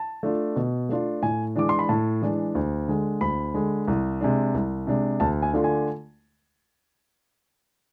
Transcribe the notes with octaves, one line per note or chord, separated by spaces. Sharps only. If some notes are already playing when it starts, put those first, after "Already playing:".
Already playing: A5
A3 D4 F4
B2
A3 D4 F4
A2 G#5
E3 G#3 D4 D6
C6
B5
A2 A5
E3 G#3 D4
D2
D3 G#3
D2 B5
D3 G#3
C2
C3 G#3 D4
C2
C3 G#3 D4
D2 A5
G#5
D3 A3 D4 F4
G#5